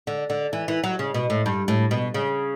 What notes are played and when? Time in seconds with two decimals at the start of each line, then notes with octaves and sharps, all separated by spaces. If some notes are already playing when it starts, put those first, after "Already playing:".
0.07 D3
0.30 D3
0.53 E3
0.68 E3
0.84 F#3
0.99 C#3
1.14 B2
1.30 A2
1.46 G2
1.68 A2
1.91 B2
2.14 C#3